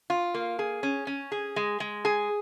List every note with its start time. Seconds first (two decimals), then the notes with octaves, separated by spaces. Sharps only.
0.10 F4
0.34 A#3
0.59 G#4
0.83 C#4
1.07 C#4
1.32 G#4
1.56 G#3
1.80 G#3
2.05 G#4